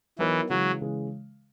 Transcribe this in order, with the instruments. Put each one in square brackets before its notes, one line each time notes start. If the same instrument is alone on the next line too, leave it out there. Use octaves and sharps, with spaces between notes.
[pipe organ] E3 [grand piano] F#3 B3 D#4 A#4 C#5
[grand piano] C#3 E3 G#3 [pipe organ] F#3
[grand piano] C#3 E3 G#3